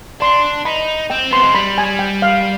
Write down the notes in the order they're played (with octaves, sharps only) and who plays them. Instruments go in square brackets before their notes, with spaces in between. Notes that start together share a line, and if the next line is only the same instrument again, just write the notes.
[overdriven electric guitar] D4 [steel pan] C6
[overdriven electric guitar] D#4 [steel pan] B5
[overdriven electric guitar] C4 [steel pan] G5
[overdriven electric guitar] B3 [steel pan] C6
[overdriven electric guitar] G#3
[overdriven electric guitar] G3 [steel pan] B5
[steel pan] G#5
G5
F5